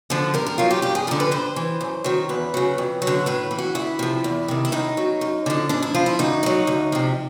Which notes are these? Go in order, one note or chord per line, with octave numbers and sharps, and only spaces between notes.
D3 F3
G2 A#4
A#4
D#3 F#3 F4
G4
G2 G4
G#4
D3 F3 A#4
B4
G2 C5
E3
F#2
D#3 F#3
E2 B4
C#3 F#3
F2
F#3
D3
A2 B4
E3
F#4
D2 E4
C3 F3
E2
C3 D#3
E4
A2 D#4
F#3
F#2
D3 F3
G#2 D4
E4
F3 F4
E4
D2 D#4
D3
F#3
D2
C3 F3